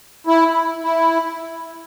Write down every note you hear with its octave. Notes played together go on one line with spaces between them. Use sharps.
E4
E4